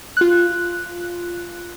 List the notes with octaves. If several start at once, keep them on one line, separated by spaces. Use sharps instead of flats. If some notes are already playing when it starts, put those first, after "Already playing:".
F4 F#6